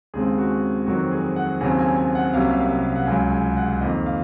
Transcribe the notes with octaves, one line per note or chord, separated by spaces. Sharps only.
D#2 C#3 G#3 C4 G#4
F#4
F2 D#3 F#3 C4 F#4
G#4
F#5
D#2 C#3 F#3 C4 G#5
G#5
G#5
F#5
C2 C3 F#3 A#3 C#4 F5
F5
F#5
C#2 C#3 F#3 G#5
G#5
F#5
F2 D#3 A#3 D#5
F5